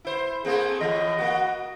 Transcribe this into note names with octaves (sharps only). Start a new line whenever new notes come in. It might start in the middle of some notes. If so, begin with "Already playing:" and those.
E4 C5
A3 A#3 C4 G#4
A2 E3 D#5
A#3 F#4